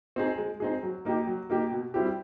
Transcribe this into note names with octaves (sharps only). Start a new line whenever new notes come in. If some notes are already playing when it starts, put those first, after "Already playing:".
C4 D#4 G#4
G#3
C4 D#4 G#4
F#3
A#3 D#4 G4
F#3
A#3 D#4 G4
B2
G3 C4 E4 G4